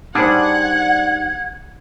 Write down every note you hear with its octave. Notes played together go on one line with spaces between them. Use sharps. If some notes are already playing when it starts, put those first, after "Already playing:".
G3 D4 D#4 G#4 C5 F#5 G#6